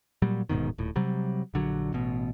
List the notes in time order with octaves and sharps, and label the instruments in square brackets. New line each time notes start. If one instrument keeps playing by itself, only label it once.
[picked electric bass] A#2 F#3 G3
D1 G#2 B2 D#3
D#1 A2
C3 F#3 G3
A#1 D3 F#3
A1 B2